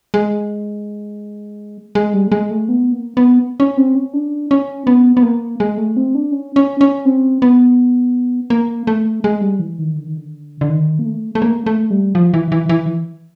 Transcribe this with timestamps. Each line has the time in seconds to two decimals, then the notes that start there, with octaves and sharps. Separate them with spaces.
0.14 G#3
1.95 G#3
2.13 G3
2.27 A3
2.32 G#3
2.51 A3
2.69 B3
2.92 A#3
3.17 B3
3.60 C#4
3.77 C4
3.95 C#4
4.14 D4
4.51 C#4
4.87 B3
5.17 B3
5.23 A#3
5.60 G#3
5.77 A3
5.97 C4
6.15 D4
6.32 C#4
6.56 C#4
6.81 C#4
7.05 C4
7.42 B3
8.50 A#3
8.87 A3
9.24 G#3
9.41 G3
9.60 E3
9.79 D#3
9.97 D3
10.07 D#3
10.17 D3
10.61 D3
10.69 D#3
10.99 A#3
11.06 A3
11.35 A3
11.42 A#3
11.66 A3
11.91 G3
12.15 F3
12.34 E3
12.52 E3
12.69 E3